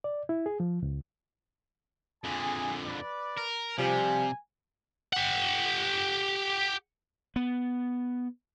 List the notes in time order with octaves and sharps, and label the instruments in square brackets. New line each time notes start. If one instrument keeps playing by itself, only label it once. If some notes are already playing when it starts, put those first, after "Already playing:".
[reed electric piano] D5
E4
G#4
F3
C#2
[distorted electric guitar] F2 D3 [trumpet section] G#4 G#5
[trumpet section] B4 D5
[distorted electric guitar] A#4
[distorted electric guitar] C3 [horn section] F3 G3 [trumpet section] G#5
[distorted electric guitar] G4 F#5
[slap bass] B3